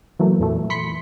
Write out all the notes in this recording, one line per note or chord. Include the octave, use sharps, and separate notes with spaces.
E3 F#3 A3 A#3
F2 A#2 E3 A3
B5 C6 B6 C#7